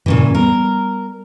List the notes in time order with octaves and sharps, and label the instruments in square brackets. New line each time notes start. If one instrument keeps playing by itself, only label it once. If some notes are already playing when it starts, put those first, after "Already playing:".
[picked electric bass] G2 F3 [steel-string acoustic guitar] A#2 C#3 E3
[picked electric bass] G3 B3 [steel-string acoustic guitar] A#4